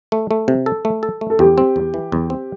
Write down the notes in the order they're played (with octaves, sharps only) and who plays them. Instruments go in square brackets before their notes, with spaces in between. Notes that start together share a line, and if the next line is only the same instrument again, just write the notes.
[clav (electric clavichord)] A3
A3
C3
A4
A3
A4
A3
[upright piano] A4
[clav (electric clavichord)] E2 [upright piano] G4
[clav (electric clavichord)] C4
E2
E3
E2
C4